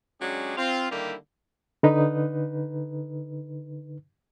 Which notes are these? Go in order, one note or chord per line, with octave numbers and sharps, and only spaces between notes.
F#3 G#3 C#4 D4 G4 G#4
C4 F4
D3 D#3 G3 A#3 E4 G4
D3 D#4 B4